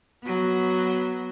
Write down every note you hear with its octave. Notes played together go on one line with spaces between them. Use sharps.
F#3 B3